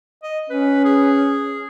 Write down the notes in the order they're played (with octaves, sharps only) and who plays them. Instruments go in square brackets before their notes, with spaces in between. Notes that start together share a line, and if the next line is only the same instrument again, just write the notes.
[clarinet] D#5
[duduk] C#4 [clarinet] B4
[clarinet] G#4